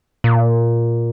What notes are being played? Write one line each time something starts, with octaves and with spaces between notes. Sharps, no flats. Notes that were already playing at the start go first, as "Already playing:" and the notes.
A#2